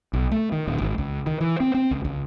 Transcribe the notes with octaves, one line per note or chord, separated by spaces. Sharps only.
B1
A3
D#3
D1
G#1
C#2
D#3
E3
C4
C4
C#2
C#2